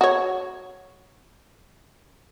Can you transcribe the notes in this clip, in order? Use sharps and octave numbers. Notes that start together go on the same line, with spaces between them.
F#4 C#5